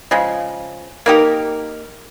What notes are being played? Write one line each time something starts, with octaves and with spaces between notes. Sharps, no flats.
C#3 F3 G#3
A#3 D#4 G4 A#4